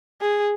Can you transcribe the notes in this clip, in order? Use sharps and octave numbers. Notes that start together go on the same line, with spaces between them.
G#4